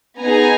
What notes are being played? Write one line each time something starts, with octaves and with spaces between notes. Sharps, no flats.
B3 D#4 G#4 G#5 A#5